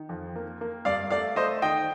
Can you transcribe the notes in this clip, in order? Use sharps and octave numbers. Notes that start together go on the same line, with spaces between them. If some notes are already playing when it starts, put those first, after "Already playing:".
Already playing: D#3
F2
A#3
A#3
G2 D5 F5
A3 D5 F5
A3 C5 D#5
D#3 D#5 G5